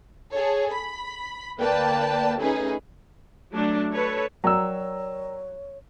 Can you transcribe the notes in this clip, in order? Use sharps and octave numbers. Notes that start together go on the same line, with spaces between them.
G#4 A4 C#5
B5
D2 A#3 B4 D5 G5 A5
A3 C#4 D#4 G#4 B4
F#3 A3 D4
A4 B4 C#5
F#3 A#4 C#5 D5 G5 A#5 E6